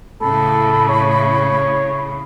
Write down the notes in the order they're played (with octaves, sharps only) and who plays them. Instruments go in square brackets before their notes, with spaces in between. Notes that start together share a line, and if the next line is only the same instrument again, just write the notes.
[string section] A2 C#3 [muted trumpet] A4 [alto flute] B5
[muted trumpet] C#5